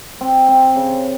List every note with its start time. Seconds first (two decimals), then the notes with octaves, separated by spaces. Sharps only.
0.21 C4
0.48 C4
0.76 C#3